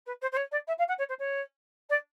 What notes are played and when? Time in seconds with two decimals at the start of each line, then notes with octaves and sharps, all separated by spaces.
0.06 B4
0.21 C5
0.32 C5
0.36 C#5
0.51 D5
0.67 E5
0.78 F5
0.88 F#5
0.98 C#5
1.08 C5
1.19 C#5
1.89 D5